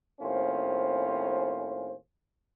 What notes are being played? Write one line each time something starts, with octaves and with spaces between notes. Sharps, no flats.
D#2 A2 C4 C#4 F4 C5